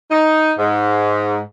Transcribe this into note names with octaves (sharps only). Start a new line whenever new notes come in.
D#4
G#2